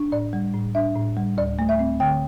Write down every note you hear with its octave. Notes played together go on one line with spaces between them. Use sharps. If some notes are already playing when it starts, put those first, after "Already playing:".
Already playing: D4
A2 D5
G3
A2
D4 E5
A2
G3
D2 D5
A3
E5
C4
D3 G5